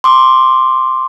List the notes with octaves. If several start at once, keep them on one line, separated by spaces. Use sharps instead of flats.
C6 D6